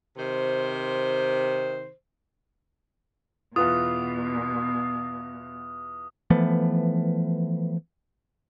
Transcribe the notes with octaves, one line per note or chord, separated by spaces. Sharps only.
C3 D#3 C5
E2 B2 B3 F4 D#6
E3 F3 A3 B3